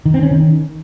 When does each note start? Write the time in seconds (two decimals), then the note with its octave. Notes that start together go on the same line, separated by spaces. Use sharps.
0.06 D#3
0.14 C4
0.23 C#4
0.31 D#3